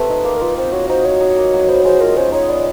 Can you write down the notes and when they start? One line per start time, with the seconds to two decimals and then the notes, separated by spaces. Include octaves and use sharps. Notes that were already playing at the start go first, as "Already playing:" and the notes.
Already playing: A3 C4 G4 B4
0.10 D#4
0.25 A#3
0.37 A#4
0.41 F4 B4
0.57 C4 C5
0.72 F#4 C#5
0.89 D#4 C5
1.05 F#4 C#5
1.20 D#4
1.37 A#3
1.53 F#3
1.68 B3 C5
1.85 G#3 C5
2.00 F4 A#4
2.17 C#4 C5
2.32 D#4 C#5
2.49 B3 D5